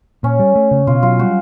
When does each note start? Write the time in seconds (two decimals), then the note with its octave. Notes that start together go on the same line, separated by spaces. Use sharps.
0.23 A#2 C#4
0.39 G3
0.56 A3
0.71 C#3
0.87 B2 F4
1.03 F#3 F4
1.19 G3 F#4